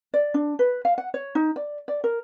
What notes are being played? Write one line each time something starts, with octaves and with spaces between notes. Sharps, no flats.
D5
D4
B4
F5
F#5
C#5
D#4
D5
D5
A#4